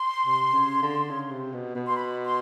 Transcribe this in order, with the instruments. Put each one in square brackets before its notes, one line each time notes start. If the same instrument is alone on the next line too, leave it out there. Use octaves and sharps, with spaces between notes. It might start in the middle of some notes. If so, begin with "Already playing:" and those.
Already playing: [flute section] C6
[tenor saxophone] C3
C#3
D3
C#3
C3
B2
B2
[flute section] C6
B5
C6